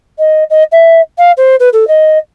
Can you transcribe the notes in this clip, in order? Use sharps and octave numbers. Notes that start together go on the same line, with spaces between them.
D#5
D#5
E5
F5
C5
B4
A4
D#5